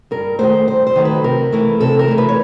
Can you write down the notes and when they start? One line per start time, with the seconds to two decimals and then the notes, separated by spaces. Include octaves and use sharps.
0.11 G2 A#4
0.39 D#3 F#3 A3 C5
0.67 G2 C5
0.87 C5
0.96 D#3 F#3 A3
1.05 B4
1.24 C3 A#4
1.52 E3 A3
1.80 C3 A4
1.99 A#4
2.08 E3 A3
2.18 B4
2.28 C#5